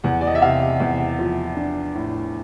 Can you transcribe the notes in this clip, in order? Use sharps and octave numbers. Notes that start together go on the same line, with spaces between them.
E2 F#5
D5
D#5
E5
C3 F5
E2
F3
D4
A2